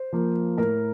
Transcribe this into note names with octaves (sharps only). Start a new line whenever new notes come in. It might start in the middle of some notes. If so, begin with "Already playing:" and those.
Already playing: C5
F3 A#3
A2 A#4 A#5